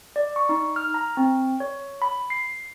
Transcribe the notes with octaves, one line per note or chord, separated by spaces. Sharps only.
D5
C#6
D#4
F6
A#5
C4
C#5
B5
C7